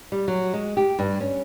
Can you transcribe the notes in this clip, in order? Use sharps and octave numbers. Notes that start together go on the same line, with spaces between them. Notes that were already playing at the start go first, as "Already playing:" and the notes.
G3
F#3
G#3
G4
G2
C#4